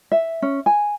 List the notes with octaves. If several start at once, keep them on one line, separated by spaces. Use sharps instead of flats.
E5
C#4
G#5